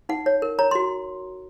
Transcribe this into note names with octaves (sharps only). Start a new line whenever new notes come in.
D#4 F#5
C#5
A#4
C#5 A#5
F#4 C6